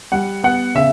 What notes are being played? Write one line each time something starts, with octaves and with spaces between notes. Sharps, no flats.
G3 F#5
B3 F#5
C#3 E5